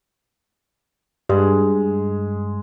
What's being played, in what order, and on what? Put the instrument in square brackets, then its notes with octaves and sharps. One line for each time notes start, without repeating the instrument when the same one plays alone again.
[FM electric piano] G2 [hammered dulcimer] G#3